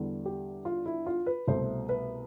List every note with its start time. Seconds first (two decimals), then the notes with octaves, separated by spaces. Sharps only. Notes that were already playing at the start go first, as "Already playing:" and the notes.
Already playing: E2 D3 G3
0.26 G4
0.65 F4
0.86 E4
1.06 F4
1.26 B4
1.47 C2 B2 A3 C5
1.89 B4